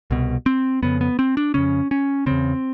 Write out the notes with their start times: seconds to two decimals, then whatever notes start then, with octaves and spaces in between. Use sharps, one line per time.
0.11 C2 B2
0.46 C4
0.82 F2 C#3 B3
1.01 B3
1.19 C4
1.37 D4
1.54 F2 C#3 C#4
1.91 C#4
2.26 E2 C#3 C4